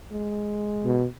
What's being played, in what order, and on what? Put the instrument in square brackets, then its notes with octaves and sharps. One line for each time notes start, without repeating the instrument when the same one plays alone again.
[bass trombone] G#3
[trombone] B2